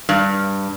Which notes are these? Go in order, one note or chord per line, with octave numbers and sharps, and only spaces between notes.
G2